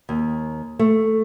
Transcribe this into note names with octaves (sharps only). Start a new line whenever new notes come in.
D#2
A3